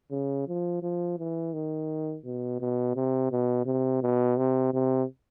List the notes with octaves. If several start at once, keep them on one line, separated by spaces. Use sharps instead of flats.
C#3
F3
F3
E3
D#3
B2
B2
C3
B2
C3
B2
C3
C3